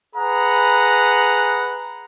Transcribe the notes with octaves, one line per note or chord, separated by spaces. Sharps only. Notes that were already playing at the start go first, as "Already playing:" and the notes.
G#4 B4 F#5 A#5